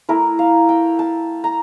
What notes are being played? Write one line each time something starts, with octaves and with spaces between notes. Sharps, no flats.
A3 E4 A#4
F5
G5
A5
A#5